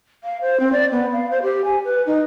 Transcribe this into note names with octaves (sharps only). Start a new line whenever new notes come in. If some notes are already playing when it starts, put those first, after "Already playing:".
F5
C5
C4
D5
B3
F5
C5
G4
G#5
B4
D#4